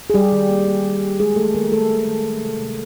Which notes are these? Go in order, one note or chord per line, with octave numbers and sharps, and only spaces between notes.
G#4
G3 G4
D#3
A#3
A#3
A#3
A#3
G3 G#3 G#4
D#3 A3 A4
D#3 A#3 A#4
A3 A#3 A4
D#3
D#3
D#3
C3
C3